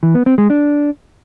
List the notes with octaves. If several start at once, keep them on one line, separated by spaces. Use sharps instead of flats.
E3
B3
C4
G#3
D4